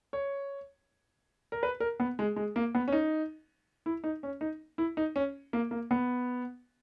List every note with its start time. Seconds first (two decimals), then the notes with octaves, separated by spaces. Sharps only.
0.13 C#5
1.52 A#4
1.63 B4
1.80 A#4
2.00 B3
2.19 G#3
2.36 G#3
2.56 A#3
2.75 B3
2.88 C#4
2.92 D#4
3.86 E4
4.04 D#4
4.23 C#4
4.41 D#4
4.78 E4
4.97 D#4
5.16 C#4
5.53 A#3
5.71 A#3
5.91 B3